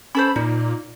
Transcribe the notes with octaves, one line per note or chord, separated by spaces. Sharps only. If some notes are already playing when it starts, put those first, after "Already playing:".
C#4 A4 C5 B5
A#2 D#4